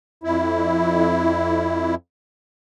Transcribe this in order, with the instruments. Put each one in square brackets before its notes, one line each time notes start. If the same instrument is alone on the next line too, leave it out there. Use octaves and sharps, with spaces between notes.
[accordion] F2 E4